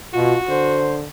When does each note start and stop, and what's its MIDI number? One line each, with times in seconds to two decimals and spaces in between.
0.14 0.35 47
0.14 0.39 65
0.14 0.87 66
0.48 1.06 50
0.48 0.99 72